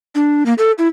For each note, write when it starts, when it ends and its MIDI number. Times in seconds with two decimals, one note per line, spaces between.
0.15 0.44 62
0.46 0.54 58
0.58 0.72 69
0.78 0.88 64